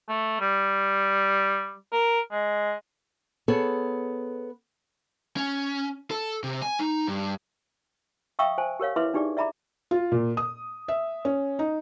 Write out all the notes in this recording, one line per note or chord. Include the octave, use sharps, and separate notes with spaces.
A3
G3
A#4
G#3
B3 G#4 A4 C#5
C#4
A4
C3
G#5
D#4
G2
E5 F5 G5 C#6 D#6 E6
C5 G#5 A5
G4 A#4 C#5 F5
E4 B4 E5 C6 D6
D4 D#4 G4 G#4 D5
D5 E5 A#5 B5 D6
F4
A#2
D#6
E5
C#4
D#4